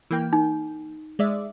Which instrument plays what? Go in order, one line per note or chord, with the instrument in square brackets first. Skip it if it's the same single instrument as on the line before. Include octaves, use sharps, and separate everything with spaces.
[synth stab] E3 A#3 G5
[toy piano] D#4
[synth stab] G#3 D5 E5